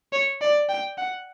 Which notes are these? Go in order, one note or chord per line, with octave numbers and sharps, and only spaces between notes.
C#5
D5
G5
F#5